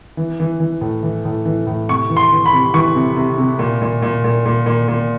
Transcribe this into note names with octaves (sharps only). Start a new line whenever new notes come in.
E3
E3
E3
A2
E3
A2
E3
A2
C3 C#6
E3
C6
E3
B5
C3
E3 C#6
C3
C3
C3
A#2
A#2
A#2
A#2
A#2
A#2
A#2